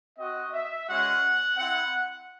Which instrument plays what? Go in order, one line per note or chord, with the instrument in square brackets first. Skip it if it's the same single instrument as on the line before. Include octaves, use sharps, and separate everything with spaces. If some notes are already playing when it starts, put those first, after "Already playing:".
[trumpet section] C4 F#4 D#5
E5
G#3 C#4 F#4 F#5
C4 E4 F#5